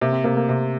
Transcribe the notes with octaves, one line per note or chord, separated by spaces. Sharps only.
C3 A#3
C4
C3 A#3
A3
A#3
C3